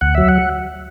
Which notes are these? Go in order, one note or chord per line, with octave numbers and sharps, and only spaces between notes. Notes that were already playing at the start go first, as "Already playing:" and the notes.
D2 F#5
F#3 E5
F#5